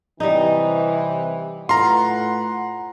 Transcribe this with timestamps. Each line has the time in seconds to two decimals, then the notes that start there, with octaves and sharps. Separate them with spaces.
0.20 C3 E3 G3 D#4
1.69 A2 F4 B4 F#5 A#5 C6